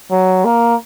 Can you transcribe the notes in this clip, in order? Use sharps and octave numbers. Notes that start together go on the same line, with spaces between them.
F#3
A#3